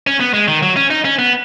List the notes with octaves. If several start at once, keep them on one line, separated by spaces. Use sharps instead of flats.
C#4
B3
G#3
D#3
F#3
C#4
D#4
C#4
B3